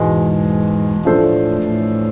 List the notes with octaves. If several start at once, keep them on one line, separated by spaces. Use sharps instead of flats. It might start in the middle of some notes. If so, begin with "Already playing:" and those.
Already playing: E2 G#2 B2 G#3 B3
A2 F3 A3 D4 A4 C5
A2